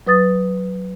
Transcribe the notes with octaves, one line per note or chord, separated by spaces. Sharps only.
F#3 B4 D#6 A6